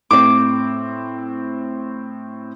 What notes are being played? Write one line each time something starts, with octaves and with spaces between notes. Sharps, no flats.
A2 C4 D6